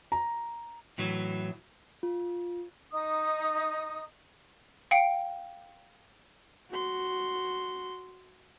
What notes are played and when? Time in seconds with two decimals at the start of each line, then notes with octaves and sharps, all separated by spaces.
0.12 A#5
0.98 A2 E3 F#3
2.03 F4
2.91 D#4 D#6
4.91 F5 G5 C#7 D7
6.71 F#4 C6